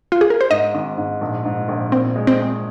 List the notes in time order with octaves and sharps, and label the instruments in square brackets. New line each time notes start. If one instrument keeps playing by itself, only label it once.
[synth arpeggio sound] F4
G#4
A#4
C5
[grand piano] G#2 [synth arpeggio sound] D#5
[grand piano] G#1
G#2
A#1
G#2
A#1
[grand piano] A#2 [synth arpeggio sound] C4
[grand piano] G#3
[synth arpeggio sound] C4
[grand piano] G#3